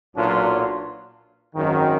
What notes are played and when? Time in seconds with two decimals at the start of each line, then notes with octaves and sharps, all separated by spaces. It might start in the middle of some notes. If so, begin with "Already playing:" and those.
0.17 B1 A#2 F#3 D4 F4
1.56 G#1 F#2 D#3